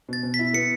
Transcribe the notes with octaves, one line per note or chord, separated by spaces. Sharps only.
B2 A6
B2
B6
E4
B3 C#7